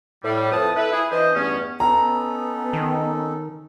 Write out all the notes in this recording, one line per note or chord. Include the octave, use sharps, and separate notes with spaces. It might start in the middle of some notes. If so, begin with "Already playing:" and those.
A2 G3
F2 A2 B4 A5 D#6
E4 A4 B4
E4 G#4
E3 D4 C5 D#5
E2 G2 A3 B3 C#4
B3 C#4 D#4 A4 A#5
D#3